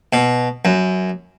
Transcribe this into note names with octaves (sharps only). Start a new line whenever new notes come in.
B2
F#2